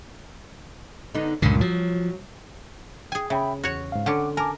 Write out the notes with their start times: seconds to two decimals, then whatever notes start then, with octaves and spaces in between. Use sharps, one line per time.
1.15 D3 B3 D#4
1.42 C#2 G2 A#2 D3
1.61 F3 F#3
3.12 G#4 G5 G#5
3.30 C#3 E5 G5 B5
3.64 E2 F#4 C#5
3.92 G#2 F5
4.06 D3 C#4 F#5 D6
4.37 A#4 G#5 A5 D6